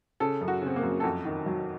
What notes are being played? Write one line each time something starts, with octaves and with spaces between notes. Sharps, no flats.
C#3 A4
F#2
F#4
C#3 C4
A#3
F#2
A4
F2 F#4
D#3
F#3